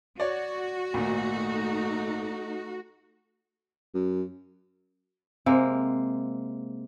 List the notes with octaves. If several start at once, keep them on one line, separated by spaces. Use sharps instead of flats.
F#4 C#5 D5
G#1 A#2 A3 D#4
F#2
C3 G#3 A#3